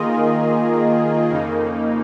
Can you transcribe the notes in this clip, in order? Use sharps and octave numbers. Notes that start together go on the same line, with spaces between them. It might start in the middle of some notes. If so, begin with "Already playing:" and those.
Already playing: D#3 A#3 F4 G#4 D#5
F2 C#3 A#3 D#4